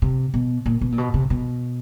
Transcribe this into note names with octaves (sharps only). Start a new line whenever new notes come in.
C3
B2
A#2
B2
A#2
B2
C3
B2